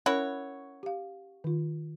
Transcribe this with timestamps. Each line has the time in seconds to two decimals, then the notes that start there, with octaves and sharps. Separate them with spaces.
0.06 C#4 E4 F#4 A#4 C#5
0.83 G4 F5
1.44 D#3 F4